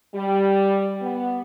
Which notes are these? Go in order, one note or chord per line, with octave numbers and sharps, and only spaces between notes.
G3
B3